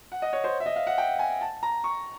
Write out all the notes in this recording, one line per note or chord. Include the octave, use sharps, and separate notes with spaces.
F#5
D#5
C#5
C5
E5
D#5
F5
F#5
G5
G#5
A5
A#5
C#6